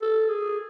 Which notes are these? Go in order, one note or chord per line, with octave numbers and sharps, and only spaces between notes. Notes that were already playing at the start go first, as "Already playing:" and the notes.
A4
G#4